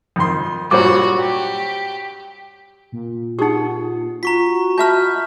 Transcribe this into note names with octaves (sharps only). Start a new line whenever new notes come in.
F2 D#3 C6
G2 A#2 F#3 F#4 C5 D6
G4
A#2
D#4 G4 G#4 F#5
F4 F#4 A#5 C#6 B6
D#5 E5 A5 B5 F6 G6